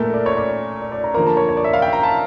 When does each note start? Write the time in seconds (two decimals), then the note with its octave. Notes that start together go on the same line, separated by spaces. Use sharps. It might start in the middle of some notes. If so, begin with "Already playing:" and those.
Already playing: A#2 A3 A#4
0.14 D5
0.26 C#5
0.37 D5
0.82 D5
0.92 D5
1.04 A#5
1.14 D3 F3 A#3 A#5
1.26 A5
1.37 C#5
1.49 C#5
1.57 D5
1.64 E5
1.74 F5
1.82 G5
1.93 A#5
2.03 A5